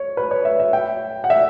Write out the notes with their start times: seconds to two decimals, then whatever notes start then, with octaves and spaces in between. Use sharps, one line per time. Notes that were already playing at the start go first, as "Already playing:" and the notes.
Already playing: C#5
0.17 B4
0.31 C#5
0.45 E5
0.60 E5
0.73 G5
1.24 F#5
1.30 E5